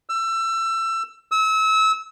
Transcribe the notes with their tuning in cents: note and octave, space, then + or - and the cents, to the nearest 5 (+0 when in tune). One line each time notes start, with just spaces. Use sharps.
E6 +25
E6 -30